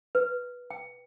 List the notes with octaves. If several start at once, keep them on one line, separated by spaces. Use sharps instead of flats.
B4
G5